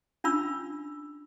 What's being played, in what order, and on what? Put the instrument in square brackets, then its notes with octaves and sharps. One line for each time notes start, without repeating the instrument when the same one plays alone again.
[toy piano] C#4 D4 F4 B5 E6